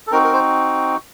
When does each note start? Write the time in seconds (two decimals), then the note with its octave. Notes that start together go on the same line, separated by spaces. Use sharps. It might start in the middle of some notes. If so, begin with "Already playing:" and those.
0.07 A4
0.11 C4 D#4 F#4 A#4
0.24 A#4
0.33 C5